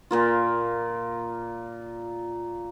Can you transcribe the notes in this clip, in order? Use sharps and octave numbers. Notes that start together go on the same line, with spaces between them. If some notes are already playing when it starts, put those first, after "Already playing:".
A#2 A#3 F4